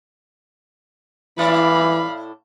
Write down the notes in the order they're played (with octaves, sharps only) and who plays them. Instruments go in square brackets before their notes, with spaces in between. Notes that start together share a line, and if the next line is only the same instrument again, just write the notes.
[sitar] A2 E4 D5 [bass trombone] E3 [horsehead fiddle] F5 B5